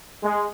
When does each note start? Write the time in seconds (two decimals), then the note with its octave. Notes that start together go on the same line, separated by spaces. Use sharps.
0.22 G#3